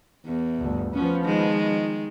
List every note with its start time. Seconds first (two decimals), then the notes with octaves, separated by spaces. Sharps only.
0.25 E2
0.59 G1 D2
0.94 F3 B3 C#4
1.24 D#3 G#3